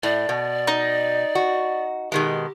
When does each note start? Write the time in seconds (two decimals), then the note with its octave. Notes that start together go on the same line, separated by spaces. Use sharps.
0.03 A2 D5
0.29 B2
0.67 D#4
1.35 F#4
2.12 B2 D#3 G#3 G4